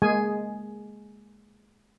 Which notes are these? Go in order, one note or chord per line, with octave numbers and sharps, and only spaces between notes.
G#3 A#3 G#4 G#5